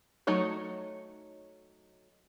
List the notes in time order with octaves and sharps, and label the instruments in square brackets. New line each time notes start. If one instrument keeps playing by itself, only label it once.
[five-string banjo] F#3 A3 D#4 C#5